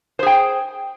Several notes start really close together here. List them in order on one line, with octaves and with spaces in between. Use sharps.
C5 G#4 G5